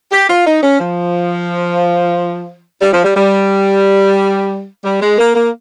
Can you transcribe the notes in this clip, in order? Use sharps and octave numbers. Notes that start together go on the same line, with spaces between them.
G4
F4
D#4
C#4
F3
G3
F3
G3
G3
G3
G#3
A#3
A#3